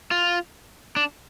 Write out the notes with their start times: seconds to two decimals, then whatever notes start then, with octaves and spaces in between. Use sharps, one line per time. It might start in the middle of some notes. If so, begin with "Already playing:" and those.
0.11 F4
0.96 D4